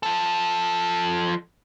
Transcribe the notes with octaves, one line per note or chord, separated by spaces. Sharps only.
F3 A4